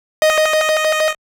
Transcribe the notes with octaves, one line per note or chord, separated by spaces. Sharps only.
D#5